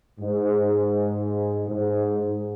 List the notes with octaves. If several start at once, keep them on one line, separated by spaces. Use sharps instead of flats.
G#2
G#2